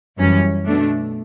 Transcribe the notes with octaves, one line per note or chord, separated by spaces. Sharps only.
F#2 E3 G3 C#4
B2 A3 D4